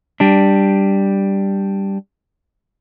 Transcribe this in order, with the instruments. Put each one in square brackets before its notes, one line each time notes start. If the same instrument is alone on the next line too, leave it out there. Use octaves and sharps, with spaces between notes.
[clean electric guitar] G3 D4